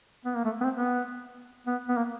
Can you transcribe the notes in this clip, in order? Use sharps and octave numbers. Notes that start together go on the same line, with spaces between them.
B3
A#3
A3
B3
C4
B3
B3
B3
A#3